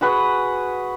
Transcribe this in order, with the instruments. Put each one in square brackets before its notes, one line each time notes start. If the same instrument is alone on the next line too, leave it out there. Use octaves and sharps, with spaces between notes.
[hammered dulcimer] F#4 G#4 B4 F#5